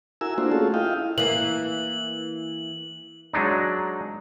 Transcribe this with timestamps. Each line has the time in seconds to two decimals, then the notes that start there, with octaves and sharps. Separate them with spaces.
0.21 E4 F#4 A#4 G#5 E6
0.38 A3 A#3 D4 F4 F#4 C5
0.51 A3 C#4 F4 F#4 G#4 A4
0.74 E4 F4 D#5 F5 G5
1.18 E3 A#3 F#7
3.33 F#3 G#3 D4 D#4